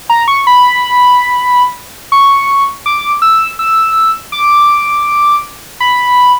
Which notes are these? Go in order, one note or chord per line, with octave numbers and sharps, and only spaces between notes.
A#5
C#6
B5
C#6
D6
E6
E6
D6
B5